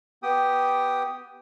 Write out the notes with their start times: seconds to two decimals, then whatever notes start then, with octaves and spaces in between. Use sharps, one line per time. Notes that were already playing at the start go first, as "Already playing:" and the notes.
0.23 B3 G4 G5 D#6